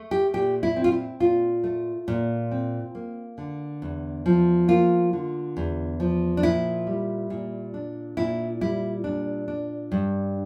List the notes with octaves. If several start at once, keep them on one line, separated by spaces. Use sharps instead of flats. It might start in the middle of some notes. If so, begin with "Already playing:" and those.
Already playing: A3
G4
A#2 G4
E4
C4
F4
E4
A#2 F4
A3
A#2
C4
A#3
D3
E2
F3
A#3 F4
D3
E2
F3
D4
A#2 E4
G3
A#2
D4
A#2 E4
G3 E4
A#2 D4
D4
G2